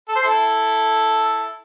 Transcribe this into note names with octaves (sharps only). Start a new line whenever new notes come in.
A4
C5
E4 A4